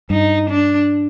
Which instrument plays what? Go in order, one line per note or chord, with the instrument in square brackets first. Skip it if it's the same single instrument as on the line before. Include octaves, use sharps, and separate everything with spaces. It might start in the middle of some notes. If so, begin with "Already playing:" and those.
[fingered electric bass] G2 [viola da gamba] D#4
[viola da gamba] D4